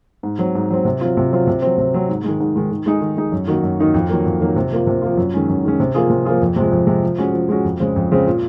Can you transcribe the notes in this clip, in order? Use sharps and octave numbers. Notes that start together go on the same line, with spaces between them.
G#2
F#3 C4
G#2
F#3 C4
C3
F#3 C4 F4
C3
F#3 C4 F4
C3
F#3 C4
C3
F#3 C4
G#2
D#3 G#3
G#2
D#3 G#3
D#3
G#3 D#4 G#4
D#3
G#3 D#4 G#4
F#2
D#3 A#3 D#4 F#4
F#2
D#3 A#3 D#4 F#4
F2
D#3 F#3 A#3
F2
D#3 F#3 A#3
C3
F3 A#3 F4
C3
F3 A#3 F4
F#2
D#3 G#3 C#4
F#2
D#3 G#3 C#4
C3
F3 A#3 F4 G#4
C3
F3 A#3 F4 G#4
F2
C3 F3 G#3
F2
C3 F3 G#3
F3
G#3 C#4 F#4
F3
G#3 C#4 F#4
F2
C#3 G#3 C4
F2
C#3 G#3 C4
A#2